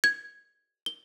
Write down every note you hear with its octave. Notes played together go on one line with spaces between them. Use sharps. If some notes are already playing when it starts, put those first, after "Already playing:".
G#6
G7